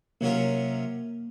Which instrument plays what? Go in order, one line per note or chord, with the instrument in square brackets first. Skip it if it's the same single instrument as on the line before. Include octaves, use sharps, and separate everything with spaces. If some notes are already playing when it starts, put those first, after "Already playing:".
[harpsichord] C3 F#3 C#4 F4 A#4 [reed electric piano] A#3